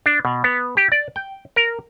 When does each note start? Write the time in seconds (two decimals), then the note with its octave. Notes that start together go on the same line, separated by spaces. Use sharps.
0.06 D4
0.25 B2
0.44 B3
0.77 G4
0.92 D5
1.16 G5
1.56 A#4